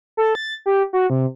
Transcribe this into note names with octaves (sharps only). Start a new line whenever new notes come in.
A4
A6
G4
F#4
C3